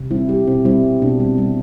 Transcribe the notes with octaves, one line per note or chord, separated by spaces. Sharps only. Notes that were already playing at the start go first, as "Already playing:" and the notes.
Already playing: C3
G3 C4 E4
G3 E4 G4
B2 C4 E4
G3 C4 E4
G3
B2 B3 D4
G3 C4
G3